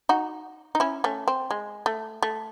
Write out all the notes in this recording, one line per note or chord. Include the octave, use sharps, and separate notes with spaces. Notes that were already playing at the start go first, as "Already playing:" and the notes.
D#4 F#4
D#4
C#4 E4
A3 C#4
C4
G#3
A3
A3